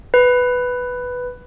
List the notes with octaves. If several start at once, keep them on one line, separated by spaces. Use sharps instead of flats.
B4